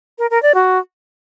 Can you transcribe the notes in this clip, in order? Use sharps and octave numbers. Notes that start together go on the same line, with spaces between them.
A#4
A#4
D5
F#4